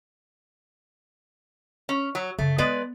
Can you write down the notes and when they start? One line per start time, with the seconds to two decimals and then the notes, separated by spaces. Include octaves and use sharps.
1.89 C#4
2.15 F#3
2.38 F#2 C#3 A3
2.58 G#3 B3 B4 D5